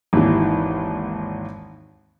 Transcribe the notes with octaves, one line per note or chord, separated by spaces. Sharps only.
G#1 D#2 E3